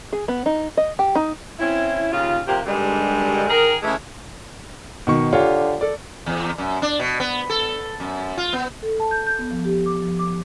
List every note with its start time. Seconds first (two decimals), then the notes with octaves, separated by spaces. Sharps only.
0.13 G#4
0.28 B3
0.46 D#4
0.77 D#5
0.99 G4
1.15 D#4
1.60 C4 C#4 E4
2.12 D#2 C#3 F4
2.48 C3 F3 A#3 G4
2.66 G2 D3 D#3 G3 G#3
3.49 D#3 G#4 A#4
3.83 C#3 E3 G#3 A3
5.07 B2 D#3 C#6
5.33 D3 F4 G4 C#5
5.81 A4 D5
6.26 E2
6.58 F#2
6.82 D4
6.99 B2
7.20 B3
7.50 A4
8.00 F#2
8.37 F4
8.53 B3
8.83 A4
9.00 A5
9.11 G6
9.27 G6
9.39 B3
9.51 F3
9.65 G4
9.86 D6
10.02 F3
10.19 D6